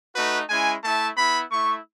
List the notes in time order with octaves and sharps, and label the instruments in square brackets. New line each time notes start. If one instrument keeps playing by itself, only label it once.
[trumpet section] A3 D#4 F#4 B4
G#3 C#4 E4 G#5
A3 E4 A5
B3 E4 B5
A3 E4 C#6